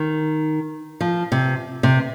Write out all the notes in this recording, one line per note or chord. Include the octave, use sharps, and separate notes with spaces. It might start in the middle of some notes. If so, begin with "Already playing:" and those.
Already playing: D#3
F3
C3
C3